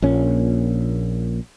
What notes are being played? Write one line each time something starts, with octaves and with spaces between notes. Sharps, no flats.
A#1 A#2 C#4